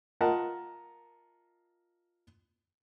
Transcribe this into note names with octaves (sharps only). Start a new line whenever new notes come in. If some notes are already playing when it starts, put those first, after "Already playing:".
F4 A#4 D#5 F#5 A5